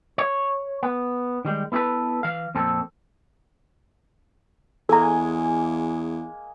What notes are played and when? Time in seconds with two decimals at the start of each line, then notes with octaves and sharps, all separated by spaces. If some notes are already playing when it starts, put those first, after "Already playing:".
0.18 C#5
0.83 B3
1.45 D#3 G3 G#3
1.72 B3 E4 G#4 A4 B4
2.23 E3 F5
2.55 F2 A#2 C4 A4
4.89 E2 G#3 A#3 A4 G#5 A#5